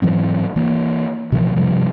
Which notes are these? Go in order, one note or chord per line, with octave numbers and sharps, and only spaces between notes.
G#2 E3 F#3 C4
E3 A#3
B2 E3 F3
G2 C3 F3 G3